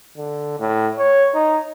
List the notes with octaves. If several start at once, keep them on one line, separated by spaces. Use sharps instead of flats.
D3
A2
C#5
D#4